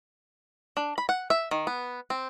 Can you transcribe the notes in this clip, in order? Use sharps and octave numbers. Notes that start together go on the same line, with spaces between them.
D4
B5
F#5
E5
D#3
B3
C4